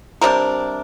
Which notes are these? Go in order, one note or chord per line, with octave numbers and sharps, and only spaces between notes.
C3 G3 D4 A#4